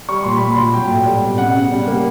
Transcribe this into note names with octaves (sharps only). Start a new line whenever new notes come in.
G3 C#6
A#2 C6
A#2 B5
C6
A#2
F#3 G5
A2
G3
B2
C#3 F#5
C#3
G3
A#3